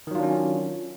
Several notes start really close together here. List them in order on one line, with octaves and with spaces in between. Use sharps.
D#3 F#3 F4 D4 C#4